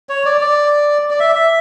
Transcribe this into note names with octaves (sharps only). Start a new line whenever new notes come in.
C#5
D5
D5
D5
E5
E5